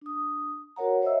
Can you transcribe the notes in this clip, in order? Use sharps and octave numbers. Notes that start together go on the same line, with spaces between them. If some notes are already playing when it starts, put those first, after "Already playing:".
D4 D#6
F#4 A#4 C#5 F#5 A#5
C5 C#5 D#5 E5 E6